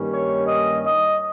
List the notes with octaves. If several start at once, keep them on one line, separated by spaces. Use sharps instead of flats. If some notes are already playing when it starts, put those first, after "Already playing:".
Already playing: G2 D#3 G3 A#3 C#4
C#5
D#5
D#5